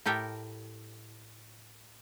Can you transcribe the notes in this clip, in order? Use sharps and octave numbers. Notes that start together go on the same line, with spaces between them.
A2 G4 A4 A#4 G5